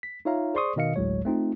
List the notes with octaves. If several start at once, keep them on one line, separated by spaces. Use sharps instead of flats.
B6
D#4 F4 C#5 E5 F5 A#5
G#4 C5 D5 C6 C#6 D#6
B2 D#3 D#5 F5 C#7
G1 D2 A2 F#3 G#3 C#5
A3 C4 D#4 F4